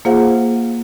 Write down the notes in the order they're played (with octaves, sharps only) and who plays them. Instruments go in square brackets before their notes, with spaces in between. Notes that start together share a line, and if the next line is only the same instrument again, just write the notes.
[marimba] A#3 F4 G#4 C5 F5 F#5